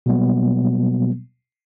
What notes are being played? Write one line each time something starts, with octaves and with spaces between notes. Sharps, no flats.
B2 F#3 G3 A#3 B3